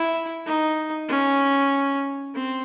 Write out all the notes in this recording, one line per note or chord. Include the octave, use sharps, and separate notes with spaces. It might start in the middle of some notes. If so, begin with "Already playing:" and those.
Already playing: E4
D#4
C#4
C4